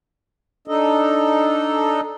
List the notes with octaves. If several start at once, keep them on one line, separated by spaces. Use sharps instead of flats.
D4 D#4 A4 D#5